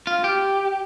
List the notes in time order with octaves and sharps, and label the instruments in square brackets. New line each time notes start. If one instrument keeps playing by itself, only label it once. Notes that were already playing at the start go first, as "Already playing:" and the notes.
[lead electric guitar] F4
G4